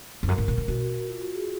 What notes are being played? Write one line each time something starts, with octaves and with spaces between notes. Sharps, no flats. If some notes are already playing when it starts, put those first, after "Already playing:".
F2
F#2 A#4
G#2
A#2
C#3
B2 F#4
F#4
F4
F#4
G#4